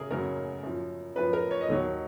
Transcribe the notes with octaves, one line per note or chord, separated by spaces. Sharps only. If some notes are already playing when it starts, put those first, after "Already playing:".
Already playing: F#2 C#3 G#4 A#4
F#2 C#3 F#3 A#4
F#2 F3
F#2 F3 B4
A#4
C#5
D#5
D#2 D#3 F#3 C#5